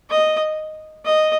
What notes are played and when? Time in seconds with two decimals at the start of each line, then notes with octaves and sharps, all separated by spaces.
0.10 D#5
1.05 D#5